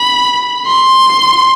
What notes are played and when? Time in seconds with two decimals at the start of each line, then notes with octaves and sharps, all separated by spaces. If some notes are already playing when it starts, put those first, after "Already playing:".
Already playing: B5
0.67 C6